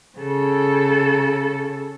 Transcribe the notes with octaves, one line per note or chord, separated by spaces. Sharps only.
C#3 A4